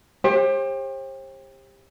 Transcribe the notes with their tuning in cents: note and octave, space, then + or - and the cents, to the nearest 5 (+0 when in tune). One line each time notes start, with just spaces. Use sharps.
G4 +25 C5 +45